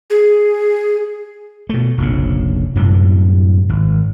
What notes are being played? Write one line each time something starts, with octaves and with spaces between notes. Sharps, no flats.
G#4
B2 A3
F1 A#1 C#3
F#2 A2 C3 G3
G#1